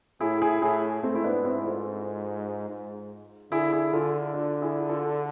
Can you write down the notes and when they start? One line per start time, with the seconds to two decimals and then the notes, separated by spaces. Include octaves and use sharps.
0.21 A2 E4 G#4
0.42 E4 G#4
0.62 A2 E4 G#4
1.03 G#2 A3 C4
1.15 E4
1.24 B3 D4
1.45 C4 E4
1.65 F4 A4
2.69 G#2
3.52 D3 E4 G#4
3.73 E4 G#4
3.93 D3 F4 A4
4.34 D4 F4
4.62 E4 G#4
4.89 F4 A4